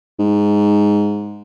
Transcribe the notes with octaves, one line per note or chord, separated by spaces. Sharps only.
G#2